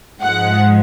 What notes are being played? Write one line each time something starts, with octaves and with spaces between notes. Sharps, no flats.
G#2 F3 G#3 F#5